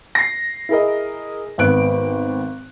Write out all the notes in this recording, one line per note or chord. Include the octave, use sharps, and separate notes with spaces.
A#6 C7
E4 G#4 A#4 D#5
G#1 B3 F#6 D7